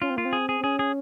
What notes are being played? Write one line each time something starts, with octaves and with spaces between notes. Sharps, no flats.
C#4 F4
C4
A#3 F4
C4
G#4
G#4
C4
C#4 G#4
G#4